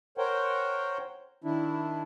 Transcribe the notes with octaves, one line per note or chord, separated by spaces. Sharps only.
A#4 C5 C#5 F#5 G5
D#3 D4 E4